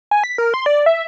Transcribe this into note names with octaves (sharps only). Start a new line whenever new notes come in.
G#5
B6
A#4
C6
D5
E5